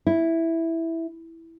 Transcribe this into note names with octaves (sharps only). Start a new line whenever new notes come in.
E4